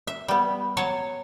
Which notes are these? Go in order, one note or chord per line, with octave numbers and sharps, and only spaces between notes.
E5
G3 B3
F#3 C#5 A5